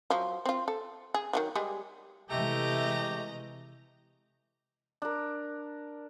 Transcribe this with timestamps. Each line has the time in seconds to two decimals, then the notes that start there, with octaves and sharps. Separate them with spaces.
0.10 F3 F#3
0.46 C4 F4
0.68 A4
1.14 G#4
1.33 D#3 E3 F#3
1.55 G3 G#3 G#4
2.30 C3 E3 G#3 A3 G4 D#5 A#5
5.02 D4 A#4